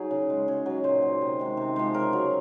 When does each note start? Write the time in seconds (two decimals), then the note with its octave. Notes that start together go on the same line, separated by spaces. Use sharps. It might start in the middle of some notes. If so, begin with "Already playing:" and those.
Already playing: F#3 D#4 G#4
0.11 C#3
0.30 G#3
0.48 C#3 C#5
0.66 F#3
0.84 A#2 C5
1.02 F#3
1.21 C3 D#5
1.39 D#3 G#3
1.57 C3
1.76 F3 G#3 C5
1.94 C#3 A#4
2.13 F#3